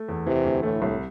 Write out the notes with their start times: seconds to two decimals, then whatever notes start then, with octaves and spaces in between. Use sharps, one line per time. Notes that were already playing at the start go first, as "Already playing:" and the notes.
Already playing: A3
0.08 E2
0.27 C3 E3
0.45 D2
0.63 A2 A3
0.82 C2